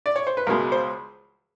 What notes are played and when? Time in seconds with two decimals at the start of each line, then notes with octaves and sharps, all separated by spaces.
0.06 D5
0.16 C#5
0.27 C5
0.37 B4
0.47 C#2 B2 G#3 A#4
0.72 C5